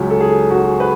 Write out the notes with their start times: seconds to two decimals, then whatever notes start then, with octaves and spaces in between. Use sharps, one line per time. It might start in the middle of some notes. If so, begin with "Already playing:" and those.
Already playing: C#2 C#3 F#3
0.10 A4
0.21 G#4
0.51 F#4
0.80 B4